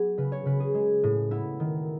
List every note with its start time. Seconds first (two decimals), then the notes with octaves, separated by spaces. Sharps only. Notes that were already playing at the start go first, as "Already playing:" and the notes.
Already playing: F#3 B3 F#4 G#4
0.18 C#3 B4
0.32 C#5
0.45 C#3 B4
0.60 G#4
0.74 G#3
1.03 A2
1.31 B3 E4
1.60 D#3